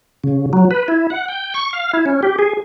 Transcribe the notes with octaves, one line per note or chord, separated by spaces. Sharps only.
C#3
F#3
B4
E4
F#5
G5
C#6
F5
E4
C#4
G4
G#4